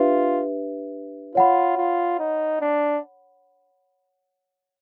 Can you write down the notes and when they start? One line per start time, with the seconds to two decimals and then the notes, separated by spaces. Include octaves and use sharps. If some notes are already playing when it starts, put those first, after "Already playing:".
Already playing: D4 F4 G4 B4 E5
1.35 F4 C#5 F#5 B5
1.77 F4
2.19 D#4
2.61 D4